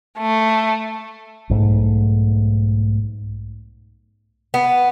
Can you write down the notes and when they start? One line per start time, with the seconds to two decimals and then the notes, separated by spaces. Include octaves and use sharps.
0.19 A3
1.49 B1 G#2 A3
4.54 B3